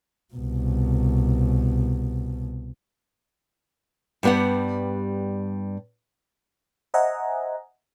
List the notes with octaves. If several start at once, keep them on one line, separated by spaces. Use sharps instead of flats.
C2 B2
G2 G3 B3 G4 F#5
C5 D#5 E5 F#5 G#5 A#5